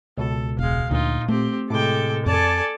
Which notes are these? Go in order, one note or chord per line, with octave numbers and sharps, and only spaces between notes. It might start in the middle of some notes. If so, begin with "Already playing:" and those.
C#2 B2 A4
E1 G#3 F5
D2 A#2 D#4 F4
A3 C4 G4
A2 C3 G#3 A4 G5 D6
F2 A4 D5 G#5 A5